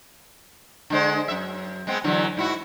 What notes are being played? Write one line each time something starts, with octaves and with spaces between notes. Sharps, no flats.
D3 G#3 C5
F#2 E5
G#3 B3 C4
D3 E3 F#3
G#2 E4 F#4